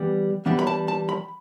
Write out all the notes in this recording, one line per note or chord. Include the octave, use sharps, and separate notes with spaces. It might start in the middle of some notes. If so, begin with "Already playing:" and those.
Already playing: E3 G3 B3 D4
E3 G3 B3 D4
B5
A5
A5
B5